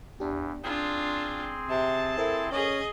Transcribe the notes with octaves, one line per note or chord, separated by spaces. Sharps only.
E2 D4 G4
C4 D4 F4 G#4 G5 C6
C3 A5
E4 A4 A#4 C5
C#4 G#4 D#5